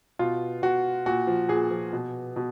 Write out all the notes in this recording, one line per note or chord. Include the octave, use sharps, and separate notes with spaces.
B2 F4
B2 F#4
A#2 F#4
F3
A#2 G#4
F3
B2
B2